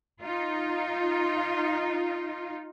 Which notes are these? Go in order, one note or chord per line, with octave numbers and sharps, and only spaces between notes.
D#4 F4